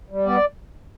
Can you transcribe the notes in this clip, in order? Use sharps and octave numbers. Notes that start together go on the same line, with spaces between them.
G3
B3 D5